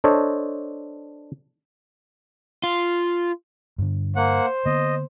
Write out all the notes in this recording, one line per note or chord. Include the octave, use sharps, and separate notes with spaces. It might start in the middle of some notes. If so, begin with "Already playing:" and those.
D4 A4 C5 C#5 D#5
F4
G2 D3
A#3 C5 F#5
D3 A#3 B3 D#5